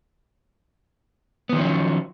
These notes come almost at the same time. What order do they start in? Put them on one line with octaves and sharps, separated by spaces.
B3 D#3 F3 C#4 F#3